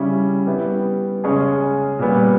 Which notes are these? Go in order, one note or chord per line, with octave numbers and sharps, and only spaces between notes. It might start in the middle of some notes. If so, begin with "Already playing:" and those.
Already playing: C#3 G3 C#4 E4
G3 B3 E4 G4
C#3 G#3 C#4 G#4
A#2 G3 B3